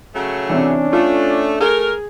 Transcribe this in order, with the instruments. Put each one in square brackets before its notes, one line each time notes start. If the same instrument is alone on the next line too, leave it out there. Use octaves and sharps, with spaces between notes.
[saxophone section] C#3 F#3 A3
[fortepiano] C3 E3 [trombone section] C#4 D4
[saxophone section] A3 [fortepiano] F4
[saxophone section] A3 A#4 [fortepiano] G#4